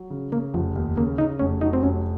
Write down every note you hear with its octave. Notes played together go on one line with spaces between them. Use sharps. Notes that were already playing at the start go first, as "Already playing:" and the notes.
Already playing: F#3
C#3
C#3 A#3
F1 F3
D#2
C#3 A#3
C#3 D#4
F1 C#4
F#3 D#4
C4
F1 C#4